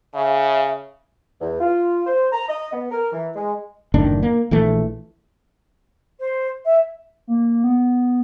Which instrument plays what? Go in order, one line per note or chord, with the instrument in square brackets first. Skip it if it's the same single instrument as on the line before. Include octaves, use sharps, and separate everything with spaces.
[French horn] C#3 [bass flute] E5
[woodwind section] E2
F4
C5
A#5
D#5
B3
A#4
E3
G#3
[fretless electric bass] F#1 A2 D#3 D4
A#3
A#1 E3 A3
[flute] C5
E5
[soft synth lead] A#3
B3